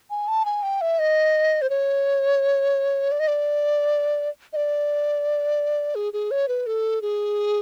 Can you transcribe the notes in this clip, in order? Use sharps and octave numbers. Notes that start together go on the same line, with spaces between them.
G#5
A5
G#5
G5
E5
D#5
C5
C#5
D5
D#5
D5
D#5
D5
G#4
G#4
C#5
B4
A4
G#4